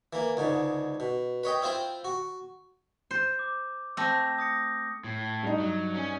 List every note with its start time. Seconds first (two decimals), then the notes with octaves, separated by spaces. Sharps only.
0.13 E3 A#3
0.37 C#2 G#2 D3
1.00 B2
1.43 B4 C#5 D#5 G5
1.62 C4 E4 F4 C5 G5
2.04 F#4
3.11 C5
3.39 D6
3.97 A3 C4 E6 G6 A#6
4.39 D#6 A#6 C#7
5.04 A2
5.43 G2 D#4
5.60 F#3
5.95 C#4